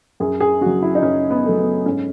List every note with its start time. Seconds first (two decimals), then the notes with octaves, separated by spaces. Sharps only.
0.20 F#2 G#4
0.40 G#4
0.61 C#3 F#3 F#4
0.82 E4
0.95 D#4
1.03 F#2 C#4
1.30 B3
1.44 C#3 F#3 A3
1.59 B3
1.86 G#2 C#4